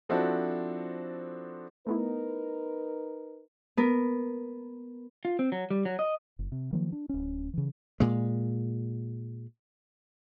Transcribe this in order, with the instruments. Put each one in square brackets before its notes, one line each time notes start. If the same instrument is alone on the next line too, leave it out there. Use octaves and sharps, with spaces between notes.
[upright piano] F3 C4 D4 E4 F#4 A4
[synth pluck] A3 B3 E4 [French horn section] D#4 A#4 B4
[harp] B3 A#4
[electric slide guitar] F4
C4
F#3
G3
F#3
D#5
[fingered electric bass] F#1
C3
D#3 F3 F#3 A#3
D4
D1 C#4
C#3 E3
[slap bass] A#2 G#3